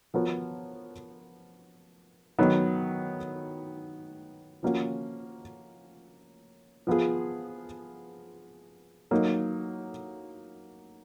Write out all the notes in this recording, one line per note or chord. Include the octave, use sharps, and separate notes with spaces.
F3 B3 F#4 A#4 C#5
D#3 F#3 B3 D#4
F3 A#3 C#4 F#4
F3 B3 F4 G#4
F#3 A#3 D#4